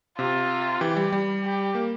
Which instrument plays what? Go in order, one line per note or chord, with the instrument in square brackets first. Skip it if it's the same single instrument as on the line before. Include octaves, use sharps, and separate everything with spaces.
[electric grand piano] C3 [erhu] F4
[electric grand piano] E3 [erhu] G4
[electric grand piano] G3
G3
[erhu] G4
[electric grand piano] A#3